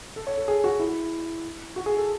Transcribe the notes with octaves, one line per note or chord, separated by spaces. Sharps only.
A4
C#5
A4
G#4
F#4
E4
F#4
G#4
A4